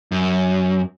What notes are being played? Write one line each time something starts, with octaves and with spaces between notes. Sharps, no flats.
F#2